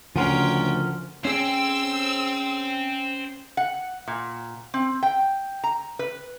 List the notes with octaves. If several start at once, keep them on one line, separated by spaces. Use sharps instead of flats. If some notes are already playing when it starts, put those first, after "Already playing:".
D2 C#3 F3 C#4 A#4 F#5 G5 C6
C#4 G#4 C5 G5 E6
F#5
A#2
C4
G5
A#5
B4